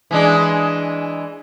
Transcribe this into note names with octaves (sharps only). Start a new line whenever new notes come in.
E3 G#3 D4